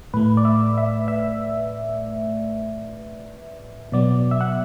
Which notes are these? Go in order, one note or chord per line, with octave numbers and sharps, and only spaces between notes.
A2 A3 B4
D5
E5
E5
E5
B2 F#3 B3 D5
E5
F#5